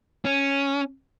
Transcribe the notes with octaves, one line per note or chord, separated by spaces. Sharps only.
C#4